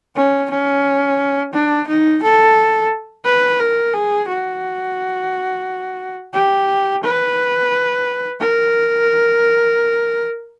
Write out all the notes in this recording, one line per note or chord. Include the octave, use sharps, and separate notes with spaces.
C#4
C#4
D4
D#4
A4
B4
A#4
G#4
F#4
G4
B4
A#4